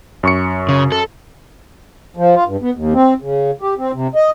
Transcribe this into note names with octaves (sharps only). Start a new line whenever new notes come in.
F#2 C#6 C#7
C#3
A4
F3
F4
G2
B3
D#2
C4
C#3
G4
C4
C3
D#5